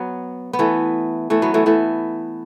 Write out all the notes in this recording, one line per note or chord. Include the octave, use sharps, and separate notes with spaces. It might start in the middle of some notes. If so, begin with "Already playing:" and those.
Already playing: F#3 B3
B3
E3 A3
E3 A3
F#3 B3
E3 A3
E3 A3